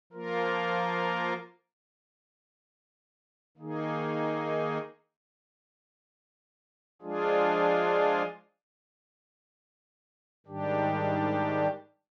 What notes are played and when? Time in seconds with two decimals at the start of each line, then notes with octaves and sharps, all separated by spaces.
0.13 F3 A#3 F4 A#4
3.57 D#3 A#3 D#4 G#4
7.02 F3 G#3 D4 F4 G#4
10.46 G#2 D#3 G3 D4 G4